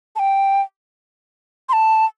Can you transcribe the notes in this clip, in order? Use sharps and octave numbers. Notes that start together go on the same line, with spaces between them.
A5
G5
C6
A5